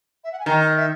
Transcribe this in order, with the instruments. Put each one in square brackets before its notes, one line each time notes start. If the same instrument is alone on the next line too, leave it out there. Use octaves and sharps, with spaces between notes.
[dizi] E5
F#5
G#5
[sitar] D#3 [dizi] A#5
[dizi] D#5
E5